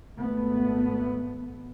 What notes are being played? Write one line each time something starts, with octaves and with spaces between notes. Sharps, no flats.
G#1 A3 B3